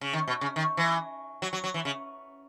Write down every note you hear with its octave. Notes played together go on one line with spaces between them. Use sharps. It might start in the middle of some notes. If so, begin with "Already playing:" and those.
C#3
D#3
B2
C#3
D#3
E3
F#3
F#3
F#3
E3
C#3